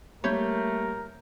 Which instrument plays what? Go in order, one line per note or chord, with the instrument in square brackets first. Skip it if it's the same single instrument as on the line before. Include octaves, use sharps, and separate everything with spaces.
[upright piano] G3 A#3 G6 [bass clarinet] A3 [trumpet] A#4 [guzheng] C#5 B5